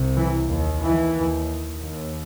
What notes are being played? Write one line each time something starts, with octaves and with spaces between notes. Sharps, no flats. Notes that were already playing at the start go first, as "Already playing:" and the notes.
Already playing: C2 C3
E3
D#2
E3
D#2
D#2